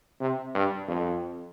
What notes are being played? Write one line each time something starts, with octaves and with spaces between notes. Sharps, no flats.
C3
G2
F2